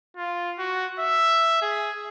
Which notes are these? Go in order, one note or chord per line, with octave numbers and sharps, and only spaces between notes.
F4
F#4
E5
G#4